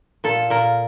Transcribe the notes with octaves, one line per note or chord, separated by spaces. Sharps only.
A#2 A4
A#2 A#4